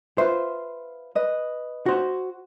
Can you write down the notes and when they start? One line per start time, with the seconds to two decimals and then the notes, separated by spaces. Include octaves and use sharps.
0.18 F4 B4 C5 E5
1.15 B4 D#5
1.86 F#4 C5